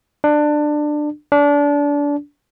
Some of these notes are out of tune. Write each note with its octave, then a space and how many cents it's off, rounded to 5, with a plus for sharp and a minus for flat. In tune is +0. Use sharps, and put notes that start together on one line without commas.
D4 +20
D4 -25